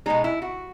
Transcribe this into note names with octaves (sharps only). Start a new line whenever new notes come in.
B2 G#3 D#4
E4
F#4